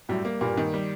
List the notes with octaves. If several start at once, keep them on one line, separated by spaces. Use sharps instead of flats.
F#2 A2 G3
A#3
G2 A#2 A#3
D#3
G3